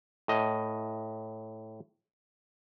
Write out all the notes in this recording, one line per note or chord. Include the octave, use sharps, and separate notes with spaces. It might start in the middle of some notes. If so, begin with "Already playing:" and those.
A2 D#5